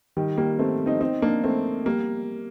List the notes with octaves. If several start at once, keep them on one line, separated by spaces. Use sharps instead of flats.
D#3 G3
G3 A#3
A3 C4
C4 D#4
C4 D#4
A#3 D4
A3 C4
G3 A#3